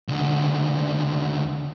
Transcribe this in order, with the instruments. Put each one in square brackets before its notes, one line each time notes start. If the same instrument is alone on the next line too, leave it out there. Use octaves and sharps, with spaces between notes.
[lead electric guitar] C#2 D3